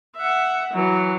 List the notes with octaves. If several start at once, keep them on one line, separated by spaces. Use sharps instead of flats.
E5 F#5
E3 F#3